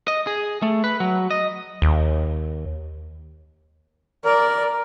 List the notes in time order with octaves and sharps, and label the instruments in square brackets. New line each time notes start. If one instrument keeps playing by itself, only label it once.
[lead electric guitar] D#5
G#4
A3
B4
F#3
D#5
[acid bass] D#2
[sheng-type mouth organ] A#4 [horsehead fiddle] D5